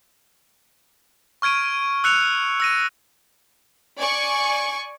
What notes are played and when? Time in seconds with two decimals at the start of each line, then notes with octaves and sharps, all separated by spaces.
1.42 C#6 F6 G#6 D7 D#7
2.04 E6 F#6 C#7 F7
2.60 E6 A#6 D#7
3.97 D5 G#5 C#6